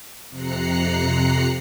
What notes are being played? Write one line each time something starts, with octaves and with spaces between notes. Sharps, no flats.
F2 C3 A#5 F#6 C7 C#7